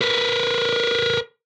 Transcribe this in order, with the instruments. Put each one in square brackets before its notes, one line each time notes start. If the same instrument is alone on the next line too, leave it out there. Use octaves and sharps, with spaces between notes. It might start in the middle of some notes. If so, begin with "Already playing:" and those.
[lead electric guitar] A#4 B4